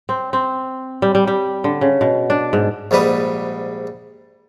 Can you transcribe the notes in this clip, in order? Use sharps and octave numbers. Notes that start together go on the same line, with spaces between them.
C4
C4
G3
G3
G3
D3
C#3
B2
D4
G#2
A#1 G#2 G3 B4 D#6